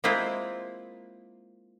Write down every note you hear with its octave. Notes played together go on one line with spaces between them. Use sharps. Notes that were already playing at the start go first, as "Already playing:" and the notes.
G#3 A#3 C4 E4 F4